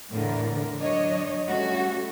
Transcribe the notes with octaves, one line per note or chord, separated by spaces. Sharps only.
E2 A2 D3 E3 A#4
F#3 D4 C#5 D#5
G3 A3 C#4 F#4